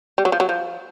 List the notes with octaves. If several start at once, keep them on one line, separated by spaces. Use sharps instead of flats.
G3
F#3
F3
F#3
F3